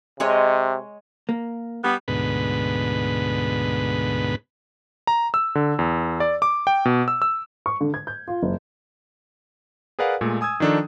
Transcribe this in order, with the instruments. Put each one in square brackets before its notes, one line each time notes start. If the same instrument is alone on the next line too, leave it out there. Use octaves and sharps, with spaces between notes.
[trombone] C3 [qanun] G#3 C#5 D#5
[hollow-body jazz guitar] A#3
[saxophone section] G3 B3
[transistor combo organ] D2 G#2 B2 B4
[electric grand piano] A#5
E6
D3
E2
D5
D6
G5
B2
E6
E6
[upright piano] C#6
D3
G#6
G6
F4
F#1
[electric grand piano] G#4 A#4 B4 D5 F5 F#5
A#2 G#3 A3
G#5 D#6 E6 G#6
D#3 F3 D4 D#4 A4